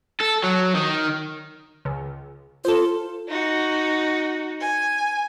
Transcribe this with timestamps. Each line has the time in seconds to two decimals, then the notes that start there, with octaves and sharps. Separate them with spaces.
0.20 A4
0.43 F#3
0.75 D#3
1.85 C#2
2.65 F4 A4 C5
3.28 D#4 F#4
4.61 G#5